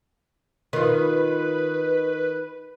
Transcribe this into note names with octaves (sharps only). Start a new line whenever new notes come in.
D#3 F4 B4